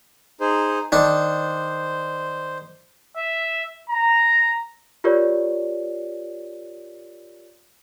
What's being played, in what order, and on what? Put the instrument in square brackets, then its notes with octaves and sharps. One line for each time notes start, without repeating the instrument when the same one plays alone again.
[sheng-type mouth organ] D#4 G#4 C5
[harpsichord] D#3 D4 [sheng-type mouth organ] C5
[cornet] E5
A#5
[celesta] F4 G4 A#4 C#5 D5